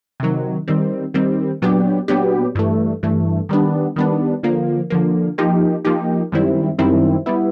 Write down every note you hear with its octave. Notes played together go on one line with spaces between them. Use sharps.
C3 D#3 F#3
D#3 G3 C4
D#3 G3 C4
A#2 F#3 B3 D4 G4
A#2 F#3 B3 D4 G4
G2 E3 A3
G2 E3 A3
D#3 G3 B3 D4
D#3 G3 B3 D4
D3 F3 A#3
D3 F3 A#3
F3 A#3 D#4 G4
F3 A#3 D#4 G4
F#2 D#3 G3 C4 E4
F#2 D#3 G3 C4 E4
G3 B3 E4